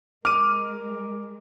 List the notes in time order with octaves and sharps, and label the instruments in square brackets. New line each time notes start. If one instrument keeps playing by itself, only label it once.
[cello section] G#3 [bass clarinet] A#4 [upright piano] D6 [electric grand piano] F6 D#7